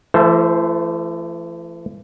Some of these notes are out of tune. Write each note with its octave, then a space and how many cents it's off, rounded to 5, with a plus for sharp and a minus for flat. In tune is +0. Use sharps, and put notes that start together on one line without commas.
E3 +45 A3 +0 C5 +0